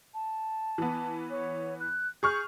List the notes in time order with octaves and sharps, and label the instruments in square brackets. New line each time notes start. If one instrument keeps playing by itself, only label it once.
[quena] A5
[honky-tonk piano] E3 B3
[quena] C#5
F#6
[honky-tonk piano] G#4 C#6 F6 [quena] G6